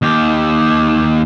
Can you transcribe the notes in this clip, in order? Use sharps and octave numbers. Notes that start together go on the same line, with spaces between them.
D#2 G4